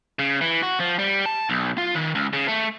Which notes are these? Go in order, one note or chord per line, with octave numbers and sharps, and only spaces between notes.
C#3
E3
F#4
F3
G3
A5
B1
F4
D#3
C#2
C#3
A3